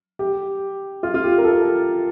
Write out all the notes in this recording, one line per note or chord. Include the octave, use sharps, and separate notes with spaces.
G4
F4
F4
G4
A#4
A4